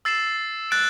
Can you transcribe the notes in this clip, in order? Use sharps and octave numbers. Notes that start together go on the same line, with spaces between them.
E6 A6 C7 E7
F#6 A6 D7